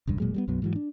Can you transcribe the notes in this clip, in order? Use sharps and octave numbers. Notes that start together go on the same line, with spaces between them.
E1 C#2 G2
E1 A#2 F#3 G#3
G3 G#3 B3
B1 F#2 F#3 B3
G#2 E3 F#3
D4